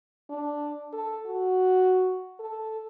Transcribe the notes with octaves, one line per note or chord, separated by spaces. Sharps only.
D4
A4
F#4
A4